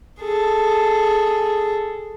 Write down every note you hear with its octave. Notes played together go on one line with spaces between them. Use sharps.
G#4 A4